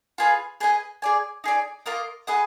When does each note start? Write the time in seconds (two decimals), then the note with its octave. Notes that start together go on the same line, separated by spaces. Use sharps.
0.18 F4 G#4 B4 F5
0.60 G#4 B4 D#5 G#5
1.02 G#4 D5 G#5
1.44 D#4 G#4 D5
1.86 A#3 F4 A#4 D#5
2.27 G#4 B4 D#5 F#5